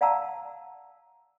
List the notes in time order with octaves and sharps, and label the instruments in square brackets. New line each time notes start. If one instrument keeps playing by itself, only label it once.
[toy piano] D5 F5 F#5 A5 A#5 E6